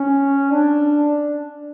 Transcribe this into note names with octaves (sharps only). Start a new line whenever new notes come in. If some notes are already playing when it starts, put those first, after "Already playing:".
Already playing: C#4
D4